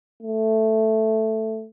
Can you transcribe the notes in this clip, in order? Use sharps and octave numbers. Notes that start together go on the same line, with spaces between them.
A3